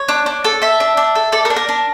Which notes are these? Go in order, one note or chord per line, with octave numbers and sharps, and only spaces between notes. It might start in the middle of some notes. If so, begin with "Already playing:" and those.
Already playing: C#5
D4
D4
A4
A4 E5
D4
D4
A4
A4 D5
A#4
D4
A#4
D4